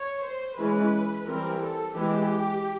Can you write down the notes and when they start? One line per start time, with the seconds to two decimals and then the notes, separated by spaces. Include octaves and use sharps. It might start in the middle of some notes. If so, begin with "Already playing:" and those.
Already playing: C#5
0.23 C5
0.57 E3 G#3 C#4 B4
1.26 E3 G3 C4 A#4
1.61 A4
1.95 E3 G#3 B3 G4